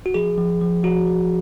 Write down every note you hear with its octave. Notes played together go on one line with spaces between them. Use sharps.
F#4
F3 G#4
F3
F3
F3 F#4
F3